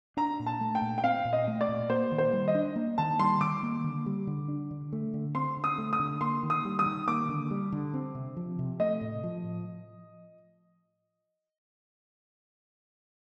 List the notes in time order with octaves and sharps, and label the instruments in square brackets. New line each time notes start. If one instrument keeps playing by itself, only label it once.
[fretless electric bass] D4 [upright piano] A#5
[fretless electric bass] A#2
[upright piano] A5
[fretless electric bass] A3
[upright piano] G5
[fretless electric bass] A#2
[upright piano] G5
[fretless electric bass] C4 [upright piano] F5
[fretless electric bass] A#2
[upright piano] D#5
[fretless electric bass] A3
[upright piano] D5
[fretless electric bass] A#2
[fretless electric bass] A#3 [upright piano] C5
[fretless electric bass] D#3
[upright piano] C5
[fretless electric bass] G3
[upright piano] D#5
[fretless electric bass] D4
A#3
[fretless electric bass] D#3 [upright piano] A5
[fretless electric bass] G3 [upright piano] C6
[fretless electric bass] D#3 [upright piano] D6
[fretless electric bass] A#3
D3
G3
D3
D4
D3
A3
D3
[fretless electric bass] C4 [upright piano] C6
[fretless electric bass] D3
[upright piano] D#6
[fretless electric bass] A3
[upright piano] D#6
[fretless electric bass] D3
[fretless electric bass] A#3 [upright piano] C6
[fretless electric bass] D#3
[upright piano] D#6
[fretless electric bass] G3
[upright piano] D#6
[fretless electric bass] D#3
[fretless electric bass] A#3 [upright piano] D6
[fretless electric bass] D3
G3
D3
C4
C3
F3
C3
[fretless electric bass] A3 [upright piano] D#5
[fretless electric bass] A2
F3